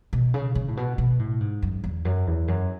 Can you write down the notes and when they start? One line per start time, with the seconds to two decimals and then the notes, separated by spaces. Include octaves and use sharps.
0.13 B2
0.34 C#3
0.55 C#3
0.68 A2
0.77 B2
0.98 B2
1.19 A2
1.40 G#2
1.62 F#2
1.84 E2
2.05 F#2
2.27 E2
2.48 F#2